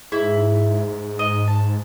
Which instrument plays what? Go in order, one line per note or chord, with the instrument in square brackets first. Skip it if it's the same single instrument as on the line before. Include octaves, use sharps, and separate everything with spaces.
[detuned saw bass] G#2 [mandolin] E4 [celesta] G#4
[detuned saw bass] G#2
[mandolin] D#5
A5